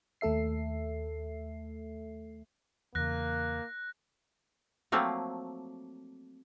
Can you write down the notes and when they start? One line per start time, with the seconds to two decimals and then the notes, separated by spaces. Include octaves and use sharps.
0.21 D#2 A3 A4 E5 C7
2.95 E2 C#3 A#3 F#6 A#6
4.92 F3 F#3 A3 A#3 C4